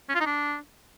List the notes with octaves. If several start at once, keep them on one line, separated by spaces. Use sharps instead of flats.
C#4
F4
D#4
D4